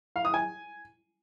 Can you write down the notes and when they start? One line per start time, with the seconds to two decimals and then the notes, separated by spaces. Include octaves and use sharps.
0.16 F5
0.25 D#6
0.34 G#5